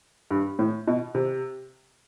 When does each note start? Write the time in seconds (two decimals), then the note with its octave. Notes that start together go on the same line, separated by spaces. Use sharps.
0.31 G2
0.59 A2
0.87 B2
1.15 C3